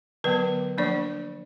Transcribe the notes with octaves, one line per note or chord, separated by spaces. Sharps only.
D3 F#3 B3 B4
F3 A#3 D4 D5